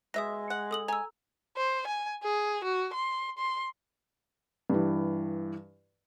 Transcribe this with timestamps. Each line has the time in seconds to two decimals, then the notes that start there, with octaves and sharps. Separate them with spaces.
0.14 B2 G#3 E5 D#6 A#6
0.50 F#5
0.71 A4 D#6 F#7
0.88 G#5 A#5 E6
1.57 C5
1.87 G#5
2.23 G#4
2.64 F#4
2.94 C6
3.38 C6
4.70 G2 E3